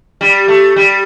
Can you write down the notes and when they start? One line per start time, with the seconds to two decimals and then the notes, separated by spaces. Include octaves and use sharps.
0.21 G3
0.48 A3
0.76 G3